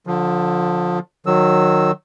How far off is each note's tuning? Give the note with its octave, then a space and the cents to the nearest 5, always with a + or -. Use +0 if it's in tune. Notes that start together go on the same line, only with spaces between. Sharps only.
D3 +0 F3 +25
D#3 -20 F#3 -15 E6 -5